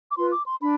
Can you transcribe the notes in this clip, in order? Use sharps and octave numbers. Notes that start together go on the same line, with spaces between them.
D6
F4 B4 C6
D6
C6
D4 B5